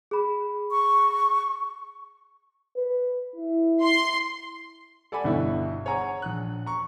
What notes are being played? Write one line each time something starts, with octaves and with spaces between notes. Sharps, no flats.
G#4 B5
C#6
B4
E4
C6
A4 D5 F#5 G#5 B5
G1 B2 G3 E4
G#4 C#5 F#5 G#5 A#5
A#1 F#6
A#5 C#6